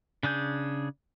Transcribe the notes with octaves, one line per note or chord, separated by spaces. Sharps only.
C#3 D4 G#4 G6